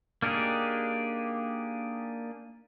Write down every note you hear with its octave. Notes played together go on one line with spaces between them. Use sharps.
A#3 D4 D#4 G4 G#4